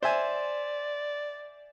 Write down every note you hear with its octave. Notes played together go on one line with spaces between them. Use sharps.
C5 D5 E5 G#5